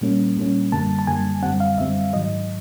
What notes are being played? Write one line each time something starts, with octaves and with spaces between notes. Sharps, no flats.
A#2 G3 A#3 C#4
A#2 G3 A#3 C#4
F#2 D3 G3 A#3 A5
A5
F#2 D3 G3 A#3 G#5
F#2 D3 G3 C4 F#5
F5
F#2 D3 G3 C4 E5
G#2 D#3 F#3 D#5